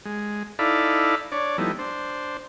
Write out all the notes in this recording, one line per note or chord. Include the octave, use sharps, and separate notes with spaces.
G#3
D#4 E4 A4 D5 F5 B5
D4 C#5 D5
F3 G3 A3 B3 D#4 E4
D4 C5